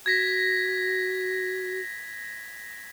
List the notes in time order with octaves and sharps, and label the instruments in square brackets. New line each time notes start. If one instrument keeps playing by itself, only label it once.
[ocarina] F#4 [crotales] G#6 A#6 B6